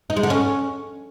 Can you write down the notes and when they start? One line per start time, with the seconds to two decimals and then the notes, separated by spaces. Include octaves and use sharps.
0.10 D#4
0.17 G#3
0.23 D3
0.30 C#4